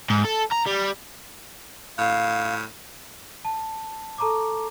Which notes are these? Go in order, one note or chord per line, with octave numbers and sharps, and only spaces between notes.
G#2
A4
A#5
G3
A2 F5
A5
A4 A5 A#5 C#6 D6